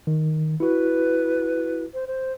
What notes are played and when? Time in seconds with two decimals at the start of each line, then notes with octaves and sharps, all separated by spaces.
0.07 D#3
0.60 E4 F#4 B4
1.93 C5
2.07 C5